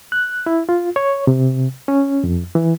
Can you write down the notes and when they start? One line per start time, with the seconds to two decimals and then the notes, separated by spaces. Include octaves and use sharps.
0.12 F#6
0.46 E4
0.69 F4
0.96 C#5
1.27 C3
1.88 C#4
2.24 F2
2.55 E3